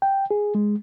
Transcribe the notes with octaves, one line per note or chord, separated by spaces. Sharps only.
G5
G#4
G#3